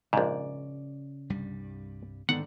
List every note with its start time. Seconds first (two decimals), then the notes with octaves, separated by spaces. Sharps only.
0.13 A#1 G#2 C#3 D5
1.30 C2 G2 G3
2.29 G#2 D3 D#3 B3 D4 F#5